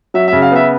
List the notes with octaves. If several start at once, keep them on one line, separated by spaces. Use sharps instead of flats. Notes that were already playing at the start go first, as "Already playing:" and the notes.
F#3 E5
C#3 E5
F5
B3 E5